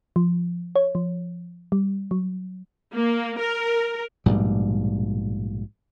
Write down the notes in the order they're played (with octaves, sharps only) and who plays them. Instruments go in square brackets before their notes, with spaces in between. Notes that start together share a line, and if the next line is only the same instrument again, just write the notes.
[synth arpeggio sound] F3
C#5
F3
G3
F#3
[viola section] A#3
A#4
[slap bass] A#1 G#2 B2 G3